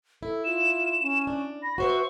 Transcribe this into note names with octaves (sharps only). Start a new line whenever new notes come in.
E4 A4
F4 E7
C#4
D4
B5 A#6
F#4 B4 C5 E5 C#6